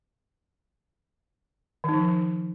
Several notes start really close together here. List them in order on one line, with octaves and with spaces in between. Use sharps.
D#3 D#4 F3